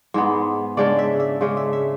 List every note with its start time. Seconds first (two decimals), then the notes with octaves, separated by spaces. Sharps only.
0.14 G#2 G#3 B3
0.77 C#3 G#3 D4 D5
0.99 E5
1.20 E5
1.41 C#3 G#3 D4 E5
1.57 E5
1.73 E5